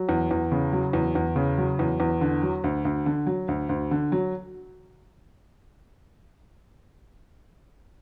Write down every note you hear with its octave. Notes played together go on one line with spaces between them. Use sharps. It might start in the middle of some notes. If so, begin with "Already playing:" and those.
Already playing: F#3
E2
E2
C#3
F#3
E2
E2
C#3
F#3
E2
E2
D3
F#3
D2
D2
D3
F#3
D2
D2
D3
F#3